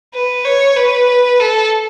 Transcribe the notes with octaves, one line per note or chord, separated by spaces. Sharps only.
B4
C#5
B4
A4